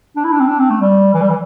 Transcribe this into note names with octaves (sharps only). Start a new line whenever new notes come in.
D4
E4
D4
C4
D4
C4
A3
G3
E3
G3
E3